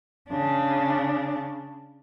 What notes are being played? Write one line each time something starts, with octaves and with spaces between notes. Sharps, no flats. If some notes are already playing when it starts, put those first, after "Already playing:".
C#3 D4